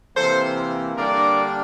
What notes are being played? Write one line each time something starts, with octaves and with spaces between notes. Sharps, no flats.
C3 E3 A#3 A4 C5
D3 G3 A#3 D4 A#4 D5